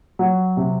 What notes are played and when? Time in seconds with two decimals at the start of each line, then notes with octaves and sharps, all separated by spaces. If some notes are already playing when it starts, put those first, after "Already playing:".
0.19 F#3
0.57 C3